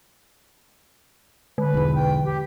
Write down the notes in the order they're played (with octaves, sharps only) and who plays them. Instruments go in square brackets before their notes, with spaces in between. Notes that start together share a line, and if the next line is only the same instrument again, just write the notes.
[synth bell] D3 [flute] B4
[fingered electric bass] B1 E2
[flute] G5
G4